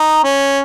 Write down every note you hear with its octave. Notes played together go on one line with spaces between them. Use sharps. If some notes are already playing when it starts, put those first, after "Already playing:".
Already playing: D#4
C#4